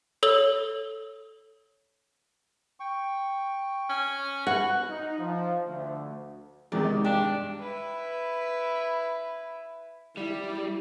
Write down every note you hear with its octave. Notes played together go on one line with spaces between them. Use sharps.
A4 C#5 E6 F#7 G7
G5 C#6
C#4
F#4 B4 F#5
D#4
F3
D2
E2 C3 D#3 G#3 D5
D#4
G2 D4 G4
E4 B4
G3 E4 G4